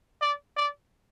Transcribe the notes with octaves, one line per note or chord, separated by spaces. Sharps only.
D5
D5